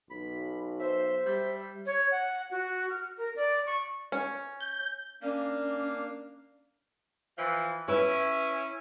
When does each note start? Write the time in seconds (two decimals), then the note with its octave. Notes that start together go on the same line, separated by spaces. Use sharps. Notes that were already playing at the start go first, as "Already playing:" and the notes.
0.10 B1 B5
0.79 C5 E5
1.26 G3
1.86 C#5
2.11 F#5
2.51 F#4
2.89 F6
3.18 A#4
3.36 D5
3.66 C#6
4.12 C#4
4.61 G6
5.22 A#3 C#4 D4 F5
7.38 E3 F3
7.88 C#4 E4 B4